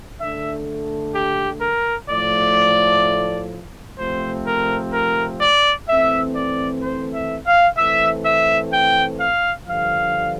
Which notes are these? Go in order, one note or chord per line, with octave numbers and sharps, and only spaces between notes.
D3 A3 D4 E5
G4
A#4
A2 F3 A3 D5
C3 F3 A3 C4 C5
A#4
A#4
D5
E3 A3 C4 E5
D5
C5
E5
F5
E3 A3 C4 E5
E5
G5
F5
G2 D3 F3 F5